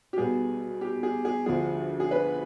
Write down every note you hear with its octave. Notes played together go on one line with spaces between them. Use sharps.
G4
B1 B2 G3 B3 G#4
G4
G#4
G#4
D2 D3 F3 G#4
G#4
B4